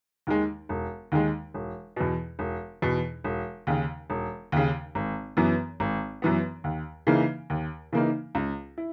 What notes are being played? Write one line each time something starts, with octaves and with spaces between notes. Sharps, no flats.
D#2 D#3 G#3
E1
D#2 D#3 G#3
E1
E2 B2
E1
E2 B2
E1
D#2 C#3
E1
D#2 C#3
G#1
F#2 E3 B3
G#1
F#2 E3 B3
D#2
C#3 E3 A#3 D#4
D#2
C#3 E3 A#3 D#4
C#2
E4